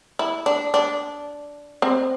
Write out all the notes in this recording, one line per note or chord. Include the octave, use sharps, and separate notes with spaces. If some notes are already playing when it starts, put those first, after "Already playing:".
E4
D4
D4
C4